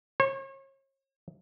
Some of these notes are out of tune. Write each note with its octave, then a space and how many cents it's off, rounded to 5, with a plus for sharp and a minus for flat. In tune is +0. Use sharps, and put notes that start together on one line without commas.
C#5 -40